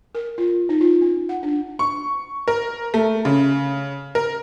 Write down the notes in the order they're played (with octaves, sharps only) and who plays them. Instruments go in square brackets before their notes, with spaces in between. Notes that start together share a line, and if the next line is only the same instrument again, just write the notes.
[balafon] A#4
F4
D#4
F4
C#4
F#5
D4
[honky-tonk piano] C#6
A#4
A3
C#3
A#4